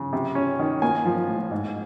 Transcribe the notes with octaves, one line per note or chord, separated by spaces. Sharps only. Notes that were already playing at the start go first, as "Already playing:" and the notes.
Already playing: C#3
C3
C#4
D#3
A#3 G#5
F3
A2
G#2